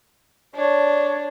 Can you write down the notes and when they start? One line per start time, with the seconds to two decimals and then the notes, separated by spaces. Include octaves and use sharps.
0.56 D4 C#5